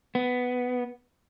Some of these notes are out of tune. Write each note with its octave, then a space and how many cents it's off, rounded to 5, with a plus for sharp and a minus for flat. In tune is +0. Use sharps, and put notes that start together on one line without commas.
B3 +5